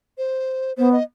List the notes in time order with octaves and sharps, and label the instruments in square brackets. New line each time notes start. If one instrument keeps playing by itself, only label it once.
[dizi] C5
[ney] B3 [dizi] C5
[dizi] D#5